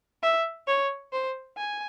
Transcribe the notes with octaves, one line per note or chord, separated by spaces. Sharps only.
E5
C#5
C5
G#5